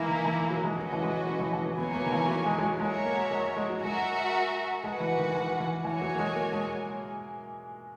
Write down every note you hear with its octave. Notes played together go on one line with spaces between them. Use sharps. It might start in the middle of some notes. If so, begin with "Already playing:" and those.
Already playing: E3 G#3 A#3 E4 A#4
D#3
E3
F#3
G#3
F#3 C#4 F#4 B4 D#5
E3
G#3
F#3
F#3
E3
E3
F#3
A#3 B3 E4 A#4 C#5 G#5
B3
D#3
E3
F#3
G#3
G#3
F#3
G#3 F#4 A#4 C#5 E5
A#3
G#3
G#3
F#3
G#3 F#4 A#4 E5
G#3 F#4 B4 F#5
E3
D#3
E3
E3
E3 F#4 C#5 G#5
F#3
A#3
G#3
A#3
G#3